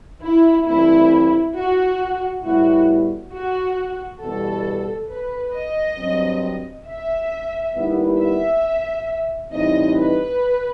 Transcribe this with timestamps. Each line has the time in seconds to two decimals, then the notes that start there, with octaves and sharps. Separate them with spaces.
0.22 E4
0.66 G2 E3 A3 C4 E4
1.55 F#4
2.43 A2 G3 B3 E4 F#4
3.33 F#4
4.20 E2 B2 G3 A4
5.09 B4
5.53 D#5
5.97 G2 F#3 C4
6.86 E5
7.74 D#2 D#3 G3 B3 E4
8.19 E5
9.51 A2 E3 G3 C4 D#4 D#5
9.96 B4